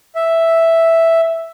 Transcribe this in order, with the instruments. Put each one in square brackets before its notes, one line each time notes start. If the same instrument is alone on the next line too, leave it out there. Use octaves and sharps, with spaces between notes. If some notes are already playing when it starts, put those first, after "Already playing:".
[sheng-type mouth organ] E5